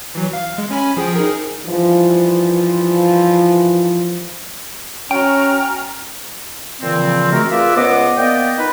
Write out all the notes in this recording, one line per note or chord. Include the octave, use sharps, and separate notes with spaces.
E3 F#3
F5
G#3
C#4 G#5 B5
F3 G#4 G5
D#4 G#4 A#4
G2 E3 F3
C#4 F#4 G5 A#5 F6
A#2 C#3 E3 F3 C4
G#3 A3 C4 F#4 A#4
F4 G#4 A#4 B4 D5 E5
C#2 B3 C5 D#5 F#5 D6
A#3 B3 D5 D#5 G5
D#4 F4 B4